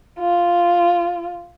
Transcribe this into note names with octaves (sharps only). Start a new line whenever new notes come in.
F4